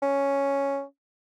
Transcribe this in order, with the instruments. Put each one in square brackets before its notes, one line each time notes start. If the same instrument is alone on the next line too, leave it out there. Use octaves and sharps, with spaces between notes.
[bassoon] C#4